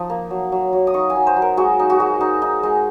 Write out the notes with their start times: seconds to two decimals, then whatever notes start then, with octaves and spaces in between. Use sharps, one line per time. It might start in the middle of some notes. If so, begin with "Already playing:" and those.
Already playing: F3 D#4
0.10 A#3
0.31 F#3
0.52 F#3
0.73 F#3
0.87 D#6
0.94 D#4 C#6
1.10 G#5
1.16 F#3
1.27 C5
1.36 F#3
1.42 A#4
1.57 G#3 F#4
1.79 D#4
1.90 F#4
2.00 G#3
2.21 D#4
2.42 D#4
2.63 G#3